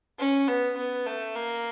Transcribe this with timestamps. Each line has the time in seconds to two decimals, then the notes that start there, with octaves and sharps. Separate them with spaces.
0.19 C#4
0.48 B3
0.77 B3
1.07 A3
1.36 A#3